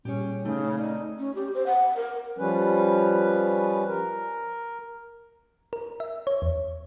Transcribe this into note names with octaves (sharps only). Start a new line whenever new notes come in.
A#2 G3 C#4 G4 G#4 C#5
C#3 A3 C4 D#4 C5
D#4 D5
C#4
G4
C5
F#5
A#4
F3 G3 C#4 B4
A#4
A#4
E5
C#5
E2